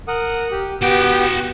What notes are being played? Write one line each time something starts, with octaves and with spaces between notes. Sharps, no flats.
A#4 F#5 D#6
G4
B3 F#4 G4 G5